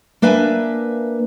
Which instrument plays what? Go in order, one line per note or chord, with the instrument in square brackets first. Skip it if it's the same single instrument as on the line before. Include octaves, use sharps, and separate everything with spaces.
[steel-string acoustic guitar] A#3 D4 B4 E5 G#5